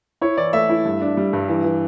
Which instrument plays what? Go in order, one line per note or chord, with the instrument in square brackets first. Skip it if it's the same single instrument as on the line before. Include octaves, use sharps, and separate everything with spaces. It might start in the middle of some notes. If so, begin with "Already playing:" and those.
[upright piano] E4 C#5
E3 D5
A3 E5
E4
G2
D4
G3
G2
E3
E3